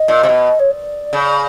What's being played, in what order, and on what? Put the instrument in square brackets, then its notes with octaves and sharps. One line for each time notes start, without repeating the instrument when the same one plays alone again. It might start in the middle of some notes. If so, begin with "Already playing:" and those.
Already playing: [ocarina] D#5
[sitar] A#2
C3
B2
[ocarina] C#5
D5
[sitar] C#3